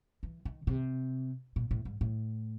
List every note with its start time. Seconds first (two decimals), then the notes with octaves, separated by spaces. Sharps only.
0.23 E3
0.45 D#3
0.67 C3
1.56 A#2
1.71 A2
1.85 G#2
2.01 A2